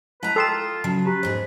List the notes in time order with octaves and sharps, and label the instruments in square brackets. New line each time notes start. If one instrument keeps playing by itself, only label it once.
[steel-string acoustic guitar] G#3 A#5 [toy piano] E4 F#5 A5 [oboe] B4
[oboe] F4 [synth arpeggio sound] A4 C6 E7 [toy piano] G5 D#6 E6
[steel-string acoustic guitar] C#3 F#3 [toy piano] A5
[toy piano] G4 G#5 A#5 [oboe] B4
[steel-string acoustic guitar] E2 G#2 G#4 [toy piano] C5